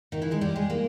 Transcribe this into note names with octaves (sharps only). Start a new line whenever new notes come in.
D#3 D#4
E3 E4
G#3 G#4
G3 G4
G#3 G#4
A#3 A#4